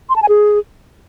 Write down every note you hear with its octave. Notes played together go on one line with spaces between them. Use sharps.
C6
A5
G#5
G#4